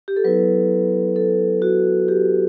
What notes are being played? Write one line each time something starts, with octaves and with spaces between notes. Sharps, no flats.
G4
A4
F#3 B3 E4 B4
A4
F#4
G4